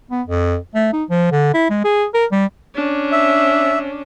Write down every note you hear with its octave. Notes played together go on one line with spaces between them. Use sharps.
B3
F2
A3
D#4
F3
D3
E4
G#3
G#4
A#4
G3
C#4 D4
E5